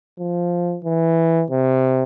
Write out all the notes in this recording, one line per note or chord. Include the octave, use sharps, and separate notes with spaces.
F3
E3
C3